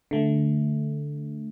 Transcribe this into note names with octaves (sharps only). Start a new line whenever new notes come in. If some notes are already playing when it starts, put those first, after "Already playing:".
D3 A3